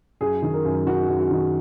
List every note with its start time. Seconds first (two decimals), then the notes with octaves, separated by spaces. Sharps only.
0.21 F#2 G#4
0.42 D#3
0.54 A#4
0.65 F#2
0.86 D#3 F#4
1.08 F#2
1.19 F#4
1.31 D#3